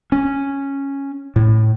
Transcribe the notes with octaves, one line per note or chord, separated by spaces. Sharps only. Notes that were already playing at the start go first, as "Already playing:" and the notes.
C#4
A2